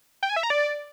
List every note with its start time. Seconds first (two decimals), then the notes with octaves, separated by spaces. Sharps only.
0.23 G5
0.29 G#5
0.36 E5
0.43 A#5
0.50 D5